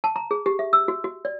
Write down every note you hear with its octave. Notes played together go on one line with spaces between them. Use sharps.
A5
A#5
G#4
G4
E5
E6
F#4
F#4
D5